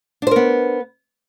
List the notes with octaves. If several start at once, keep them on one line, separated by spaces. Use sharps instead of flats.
B3 D4 A#4 C5